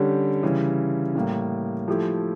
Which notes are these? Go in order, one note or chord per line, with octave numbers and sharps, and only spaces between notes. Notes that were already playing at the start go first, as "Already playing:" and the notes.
Already playing: D3 G3 C#4 G4
C#3 E3 G3
A2 G3 A#3
F3 A3 E4 G4